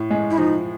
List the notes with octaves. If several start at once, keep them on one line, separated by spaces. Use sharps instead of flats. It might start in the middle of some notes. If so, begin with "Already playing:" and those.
Already playing: A2
G#3
E4
F3 D#4